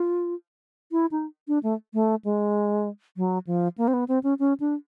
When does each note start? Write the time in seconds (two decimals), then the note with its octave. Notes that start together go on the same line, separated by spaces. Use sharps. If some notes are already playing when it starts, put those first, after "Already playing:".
Already playing: F4
0.92 E4
1.11 D#4
1.48 D4
1.63 A3
1.94 A3
2.25 G#3
3.17 F#3
3.47 F3
3.78 A#3
3.88 C4
3.94 B3
4.08 C4
4.23 C#4
4.39 C#4
4.60 D4